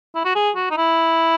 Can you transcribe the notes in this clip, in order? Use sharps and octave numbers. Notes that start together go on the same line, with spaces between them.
E4
F#4
G#4
F#4
D#4
E4